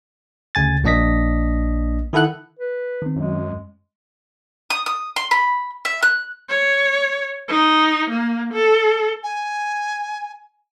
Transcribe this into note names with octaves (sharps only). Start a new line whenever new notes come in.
D2 C#3 G#5 A6
A#1 A#3 D4 D#5 A#6 B6
D#3 E4 A4 F#5 F#6
B4
D#3 C4
F#2 G#3
D#6
D#6
C6
B5
E5
F#6
C#5
D#4
A#3
A4
G#5